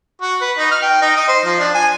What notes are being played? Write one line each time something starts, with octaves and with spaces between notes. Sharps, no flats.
F#4
B4
D#4
F6
G5
D#4
D#5
C5
F3
D4
G#5